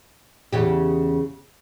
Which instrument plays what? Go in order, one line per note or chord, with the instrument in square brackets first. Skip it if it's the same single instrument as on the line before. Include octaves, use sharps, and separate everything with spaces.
[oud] E2 C#3 G4